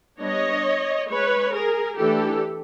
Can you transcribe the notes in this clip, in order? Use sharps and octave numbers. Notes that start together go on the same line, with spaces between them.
G3 B3 D4 C#5 D#5
G#3 C#4 B4 C#5
G#4 A#4
E3 A3 D4 G4 A4